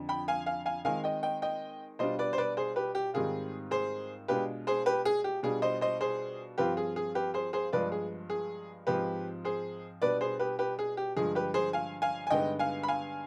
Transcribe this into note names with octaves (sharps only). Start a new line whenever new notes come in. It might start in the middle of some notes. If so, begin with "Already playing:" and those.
Already playing: F2 D3 F3
G5 B5
F5 G#5
F5 G#5
F5 G#5
D#3 G#3 C4 F5 G#5
D#5 G5
D#5 G5
D#5 G5
B2 G3 D4 F4 C5 D#5
B4 D5
C5
B4 D5
G#4 C5
G4 B4
G4
G#2 D#3 G3 C4 F4 G#4
G#4 C5
B2 G#3 D4 F4 G4 B4
G#4 C5
G4 B4
G#4
G4
B2 G3 D4 F4 G#4
C5 D#5
C5 D#5
G#4 C5
G2 F3 C4 F4 G4 B4
G#4
G#4
G4 B4
G#4 C5
G#4 C5
G2 F3 G#3 B3 F4 B4 D5
G#4
G#4
G#2 F3 G#3 C4 F4 G4 B4
G#4 C5
B2 G3 B3 D4 B4 D5
G#4 C5
G4 B4
G4 B4
G#4
G4
G2 D3 F3 G#3 G#4
G4 B4
G#4 C5
F5 G#5
F5 G#5
G#5
G2 D3 G#3 B3 D#4 D#5 G5
F5 G#5
B5
F5 G#5